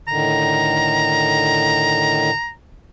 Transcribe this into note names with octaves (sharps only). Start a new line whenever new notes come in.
A2 D3 D#3 A#5